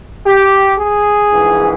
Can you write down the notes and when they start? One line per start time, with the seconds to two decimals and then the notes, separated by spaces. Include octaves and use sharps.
0.26 G4
0.79 G#4
1.31 A#1 G#2 E3